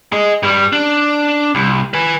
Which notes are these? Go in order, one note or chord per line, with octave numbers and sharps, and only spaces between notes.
G#4 D#5
G2 G3
D4
C2
B4 G#5